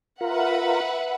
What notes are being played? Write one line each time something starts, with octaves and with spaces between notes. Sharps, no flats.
F4 A#4 B4 E5 F#5